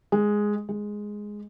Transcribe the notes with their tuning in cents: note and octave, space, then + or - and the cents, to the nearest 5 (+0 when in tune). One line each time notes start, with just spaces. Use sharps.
G#3 +0
G#3 +0